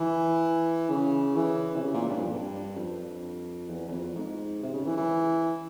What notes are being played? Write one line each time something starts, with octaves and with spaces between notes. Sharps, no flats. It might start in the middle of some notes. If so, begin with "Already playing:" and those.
Already playing: E3
C#3
E3
C3
C#3
A#2
G2
F2
G2
F2
E2
E2
F2
G#2
C3
C#3
E3
E3